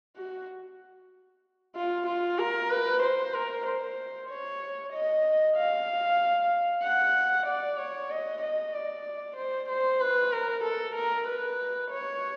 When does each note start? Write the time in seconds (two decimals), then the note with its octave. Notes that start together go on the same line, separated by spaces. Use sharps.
0.17 F#4
1.76 F4
2.07 F4
2.39 A#4
2.71 B4
3.03 C5
3.34 A#4
3.66 C5
4.29 C#5
4.93 D#5
5.57 F5
6.83 F#5
7.47 D5
7.78 C#5
8.10 D#5
8.42 D#5
8.74 D5
9.37 C5
9.69 C5
10.01 B4
10.32 A#4
10.64 A4
10.95 A#4
11.27 B4
11.91 C#5